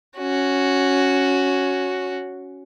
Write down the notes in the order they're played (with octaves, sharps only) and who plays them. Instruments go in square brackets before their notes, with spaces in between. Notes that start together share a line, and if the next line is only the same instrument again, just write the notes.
[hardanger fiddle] C#4 F#4